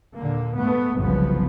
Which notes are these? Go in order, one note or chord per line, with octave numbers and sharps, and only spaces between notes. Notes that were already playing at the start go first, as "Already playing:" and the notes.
D#2 A#2 D3 A#3
G#2 A3 B3
F#1 C2 F#2 C#3 F3 B3